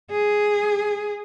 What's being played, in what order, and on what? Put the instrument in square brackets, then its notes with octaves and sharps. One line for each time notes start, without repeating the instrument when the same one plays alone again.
[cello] G#4